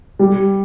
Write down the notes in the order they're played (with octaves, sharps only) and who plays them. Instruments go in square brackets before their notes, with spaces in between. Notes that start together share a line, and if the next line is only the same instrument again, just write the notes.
[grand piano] G3